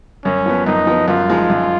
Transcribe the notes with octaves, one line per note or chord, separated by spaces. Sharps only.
F#2 C#4
F3 B3
F#2 D#4
F3 B3
F#2 F4
F3 G#3 D#4
F#2